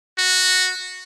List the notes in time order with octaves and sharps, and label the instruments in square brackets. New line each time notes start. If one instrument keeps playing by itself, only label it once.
[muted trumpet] F#4